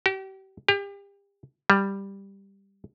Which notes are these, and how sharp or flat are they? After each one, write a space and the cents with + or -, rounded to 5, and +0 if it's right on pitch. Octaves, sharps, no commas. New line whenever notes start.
G4 -35
G4 +35
G3 +5